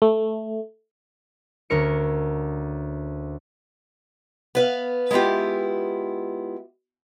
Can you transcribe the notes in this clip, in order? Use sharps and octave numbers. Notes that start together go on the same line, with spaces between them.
A3
D2 C#4 A#4 C#7
B3 B4 F5
G#3 B3 E4 F4 G4